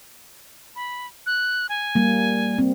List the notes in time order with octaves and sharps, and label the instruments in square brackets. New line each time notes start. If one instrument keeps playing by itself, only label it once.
[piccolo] B5
F#6
G#5
[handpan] G3 A#3
C4